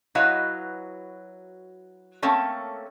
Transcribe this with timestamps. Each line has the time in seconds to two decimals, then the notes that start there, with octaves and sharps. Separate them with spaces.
0.15 F#3 E4 F#4 B4 D#5 F5
2.22 A3 A#3 C4 C#4 A4